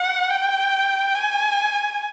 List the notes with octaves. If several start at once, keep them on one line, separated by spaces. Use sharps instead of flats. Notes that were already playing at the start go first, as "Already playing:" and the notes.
Already playing: F#5
G5
G#5